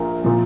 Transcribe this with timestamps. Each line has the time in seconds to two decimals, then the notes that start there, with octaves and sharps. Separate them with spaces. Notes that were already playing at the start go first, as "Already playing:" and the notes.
Already playing: A#1 A#2 F3 A#4
0.24 A#2 F3